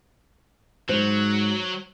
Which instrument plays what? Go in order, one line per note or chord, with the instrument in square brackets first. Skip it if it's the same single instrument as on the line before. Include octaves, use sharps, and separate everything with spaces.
[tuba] G#2 [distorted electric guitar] F#3 [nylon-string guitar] C5